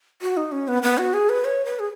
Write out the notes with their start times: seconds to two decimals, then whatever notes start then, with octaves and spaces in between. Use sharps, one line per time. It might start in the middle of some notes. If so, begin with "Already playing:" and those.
0.22 F#4
0.37 D#4
0.52 C#4
0.68 B3
0.83 B3
0.98 F#4
1.14 G#4
1.29 B4
1.45 C#5
1.65 B4
1.79 G#4